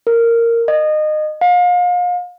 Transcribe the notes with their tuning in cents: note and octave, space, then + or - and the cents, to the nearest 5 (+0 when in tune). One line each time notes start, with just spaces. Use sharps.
A#4 -10
D#5 -25
F5 +35